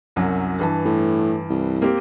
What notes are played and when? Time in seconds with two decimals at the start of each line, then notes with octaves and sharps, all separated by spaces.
0.16 C2 F#2 F#3
0.59 G2 E3 A5
0.86 A2
1.50 C2
1.82 A#3 C4 G4